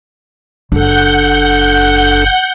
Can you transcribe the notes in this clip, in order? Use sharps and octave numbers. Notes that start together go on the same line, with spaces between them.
F#1 D4 A4 F#5 G6